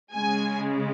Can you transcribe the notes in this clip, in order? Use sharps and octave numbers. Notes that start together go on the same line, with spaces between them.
C#3 G#3 G#5